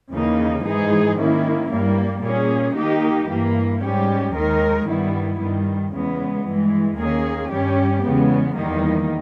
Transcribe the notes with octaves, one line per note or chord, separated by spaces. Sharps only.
D#2 C#3 E3 A#3 D#4
G#2 E3 G#3 D#4 G#4
D#3 A#3 C#4 E4
G2 G3 A#3
A#2 A#3 C#4 G#4
D#3 A#3 D#4 G4
G2 E3 A#3
G#2 G3 C#4 G4
D#2 D#3 G#3 D#4 A#4
G2 D#3 G3 B3 E4
G2 D#3 G3
E2 C#3 G#3 B3
G2 E3 G#3
D#2 D#3 A#3 C#4 G#4
G2 G3 C#4 G4
E2 C#3 G#3 B3
E2 D#3 G3 A#3 D#4